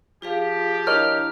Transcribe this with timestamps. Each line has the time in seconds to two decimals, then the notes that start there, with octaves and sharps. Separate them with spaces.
0.22 F3 F4 G4 G#4 F5
0.87 D4 E4 A#4 C#5 D#5 A#5 F6